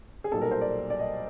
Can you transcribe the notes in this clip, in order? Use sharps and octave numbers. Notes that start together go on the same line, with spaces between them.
G#4
B1 A#2 G3 A4
A#4
C5
D5
D5
D#5